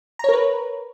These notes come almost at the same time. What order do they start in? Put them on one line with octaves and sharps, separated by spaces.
A#5 C#5 A#4 B4